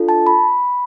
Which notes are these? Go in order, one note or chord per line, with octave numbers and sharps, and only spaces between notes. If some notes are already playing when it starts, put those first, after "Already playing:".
Already playing: D4 F4 A4
A5
B5